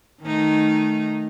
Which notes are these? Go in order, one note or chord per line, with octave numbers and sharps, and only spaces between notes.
D#3 A3 D#4